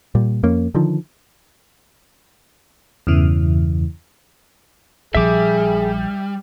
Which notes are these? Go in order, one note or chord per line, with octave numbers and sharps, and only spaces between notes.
A#2 G3
F2 A#3 C#4
D3 D#3 F3
E2 G2 C#3 E3
A#1 F3 G3 G#4 E5 D6